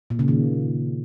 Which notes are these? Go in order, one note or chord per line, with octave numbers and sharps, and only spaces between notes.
A#2
C#3
D#3